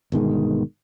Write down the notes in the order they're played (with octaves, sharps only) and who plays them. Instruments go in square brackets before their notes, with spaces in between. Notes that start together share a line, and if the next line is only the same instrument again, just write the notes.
[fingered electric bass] G1 B2 D#3 G#3